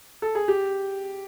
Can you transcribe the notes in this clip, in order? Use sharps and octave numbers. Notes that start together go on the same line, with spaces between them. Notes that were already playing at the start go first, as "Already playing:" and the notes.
A4
G#4
G4